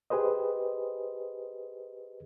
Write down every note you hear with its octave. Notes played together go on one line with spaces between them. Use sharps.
G4 G#4 B4 C5 D#5